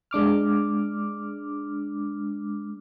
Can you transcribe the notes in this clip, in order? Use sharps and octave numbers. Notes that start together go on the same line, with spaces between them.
G#3 D4 D6 F6